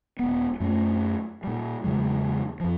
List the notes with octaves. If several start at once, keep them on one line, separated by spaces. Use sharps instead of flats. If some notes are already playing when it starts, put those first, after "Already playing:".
D#1 B3
F#2 A3 C#4
A#2 G3
E2 C#3 F#3 G#3
F2 F3